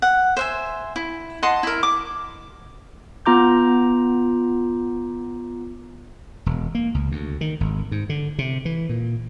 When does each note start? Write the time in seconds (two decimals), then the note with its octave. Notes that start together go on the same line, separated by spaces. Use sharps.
0.02 F#5
0.37 C5 E5 G#5
0.96 E4
1.43 D#5 F#5 A5 C6
1.63 E4 A#4
1.83 D6
3.26 B3 F4 A#5 D6 G6
6.46 E1
6.75 A#3
6.94 C#2
7.12 D2
7.41 D#3
7.60 G#1
7.91 G#2
8.09 D3
8.39 C3
8.65 E3
8.89 A#2